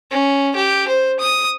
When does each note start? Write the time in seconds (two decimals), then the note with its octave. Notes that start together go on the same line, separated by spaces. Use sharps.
0.11 C#4
0.56 G4
0.88 C5
1.20 D#6